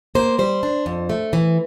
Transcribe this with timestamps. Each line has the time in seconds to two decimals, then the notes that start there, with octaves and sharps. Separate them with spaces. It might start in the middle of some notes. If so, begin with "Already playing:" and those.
0.15 A#3 C5
0.39 G3 C5
0.63 D4
0.86 F2
1.10 A3
1.33 E3